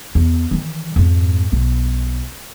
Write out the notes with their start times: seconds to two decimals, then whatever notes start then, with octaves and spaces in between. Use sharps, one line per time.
0.15 E2
0.51 D#3 E3
0.96 F2 G#2
1.52 B1